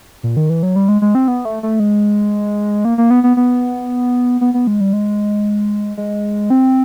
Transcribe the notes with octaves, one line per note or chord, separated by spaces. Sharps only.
A#2
D#3
E3
F#3
G3
G#3
G#3
C4
B3
A3
A3
G#3
A#3
A#3
B3
B3
B3
B3
B3
G#3
G3
G#3
G#3
C4